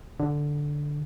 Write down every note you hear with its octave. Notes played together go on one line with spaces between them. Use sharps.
D3